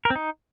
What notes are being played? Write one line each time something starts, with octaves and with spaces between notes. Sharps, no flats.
A#4
C4
D#4